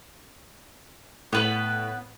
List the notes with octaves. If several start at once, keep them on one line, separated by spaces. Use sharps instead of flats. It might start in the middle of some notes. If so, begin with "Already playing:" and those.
A2 B3 B4